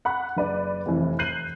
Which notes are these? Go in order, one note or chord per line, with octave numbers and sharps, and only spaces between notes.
F#5 B5 F#6
F#1 B4 D5
F1 E3
F#6 G6 C7 D#7 F#7